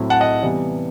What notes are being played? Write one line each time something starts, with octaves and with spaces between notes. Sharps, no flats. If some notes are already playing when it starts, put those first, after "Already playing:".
Already playing: A2 F#3 C4 E4
F#5 A5
D#5 F#5
C3 E3 G3 B3